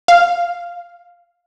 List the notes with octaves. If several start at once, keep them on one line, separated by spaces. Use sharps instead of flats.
F5